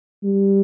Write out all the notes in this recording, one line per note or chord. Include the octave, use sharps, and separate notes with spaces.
G3